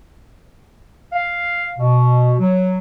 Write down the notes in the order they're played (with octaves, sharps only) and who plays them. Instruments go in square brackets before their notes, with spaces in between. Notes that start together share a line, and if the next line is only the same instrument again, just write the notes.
[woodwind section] F5
B2
F#3